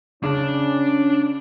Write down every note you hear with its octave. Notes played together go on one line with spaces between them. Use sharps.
C#3 C#4 D4 A5